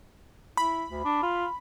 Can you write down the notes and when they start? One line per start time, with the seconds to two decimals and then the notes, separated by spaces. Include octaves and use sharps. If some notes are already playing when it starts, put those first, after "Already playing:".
0.57 E4 B5
0.90 D2
1.04 D4
1.22 F4